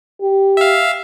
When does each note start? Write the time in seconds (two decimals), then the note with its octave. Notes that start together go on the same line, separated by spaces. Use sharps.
0.21 G4
0.57 E5 F5